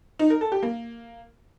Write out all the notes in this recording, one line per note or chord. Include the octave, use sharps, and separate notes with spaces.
D#4
A#4
A4
G4
A#3